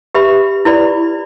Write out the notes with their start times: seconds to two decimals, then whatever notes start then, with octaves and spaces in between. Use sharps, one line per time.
0.15 G4 B4 E5 B5
0.65 E4 B4 D5 B5